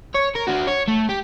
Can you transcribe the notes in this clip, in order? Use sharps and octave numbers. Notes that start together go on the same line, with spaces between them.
C#5
A#4
D4 F#4
C#5
A3
G4